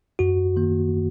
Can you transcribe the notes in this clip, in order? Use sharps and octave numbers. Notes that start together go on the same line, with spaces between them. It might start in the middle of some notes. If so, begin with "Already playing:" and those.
F#2 F#4
D#3 A#3